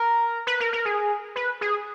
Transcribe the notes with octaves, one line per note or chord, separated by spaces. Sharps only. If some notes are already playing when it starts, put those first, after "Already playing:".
Already playing: A#4
B4
A#4
A#4
G#4
B4
G#4